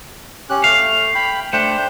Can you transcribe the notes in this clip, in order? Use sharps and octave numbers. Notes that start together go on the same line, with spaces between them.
C#4 G4 F#6
A3 F5
G5 B5
A3 D4 C5 G5